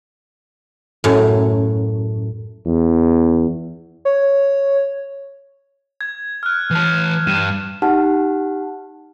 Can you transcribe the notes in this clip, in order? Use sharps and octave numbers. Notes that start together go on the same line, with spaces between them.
F#2 A2
E2
C#5
G#6
F6 F#6
E3 A5
G2 D#7 E7
D#4 G4 F#5 A5 F6